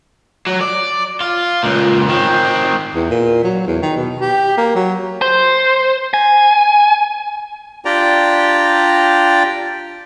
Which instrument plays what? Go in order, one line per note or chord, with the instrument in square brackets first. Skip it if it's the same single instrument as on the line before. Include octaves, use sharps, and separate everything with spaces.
[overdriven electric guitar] F#3
D5
F4
C#2 A#2
D#3 C4
[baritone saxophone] E2
A#2
F#3
E2
D#3
B2
G4
A#3
F#3
[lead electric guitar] C5
G#5
[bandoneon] D4 F4 G4 D5 G5 A#5